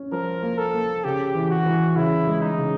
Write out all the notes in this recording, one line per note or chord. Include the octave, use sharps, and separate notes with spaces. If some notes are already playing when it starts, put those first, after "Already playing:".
Already playing: C#4
F3 A#4
A#3
A4
A#3
C#3 G4
E3
F#4
E3
C#3 E4
G#3
D#4
C#3